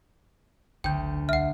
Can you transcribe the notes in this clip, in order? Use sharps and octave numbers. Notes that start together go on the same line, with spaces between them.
G#1 D2 G5 G6
C2 E5 F#5 F6